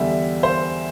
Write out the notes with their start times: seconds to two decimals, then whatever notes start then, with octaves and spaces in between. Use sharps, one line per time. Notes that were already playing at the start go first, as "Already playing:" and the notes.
Already playing: E2 D3 G3 E5
0.43 C5